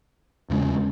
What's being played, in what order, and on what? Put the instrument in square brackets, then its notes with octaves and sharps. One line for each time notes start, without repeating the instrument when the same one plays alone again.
[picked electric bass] E2 C#3 G#3 C#4